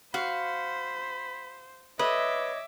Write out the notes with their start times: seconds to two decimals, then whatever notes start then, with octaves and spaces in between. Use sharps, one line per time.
0.14 F#4 C5 F5 B5
1.99 B4 C#5 D#5 E5 D6